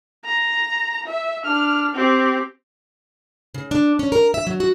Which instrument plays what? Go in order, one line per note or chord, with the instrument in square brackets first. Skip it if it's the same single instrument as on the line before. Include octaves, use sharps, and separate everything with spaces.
[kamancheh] A#5
E5
D4 F6
C4 G4
[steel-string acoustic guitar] C#3
D4
C#4
A#4
E5
F#3
F#4